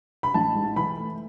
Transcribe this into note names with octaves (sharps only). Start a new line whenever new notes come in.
B5
A1 A5
G#2
E3 B5
A3